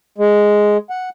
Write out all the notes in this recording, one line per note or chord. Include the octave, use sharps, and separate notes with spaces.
G#3
F#5